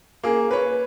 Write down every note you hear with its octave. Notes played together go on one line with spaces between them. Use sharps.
A#3 G#4
B4 C#5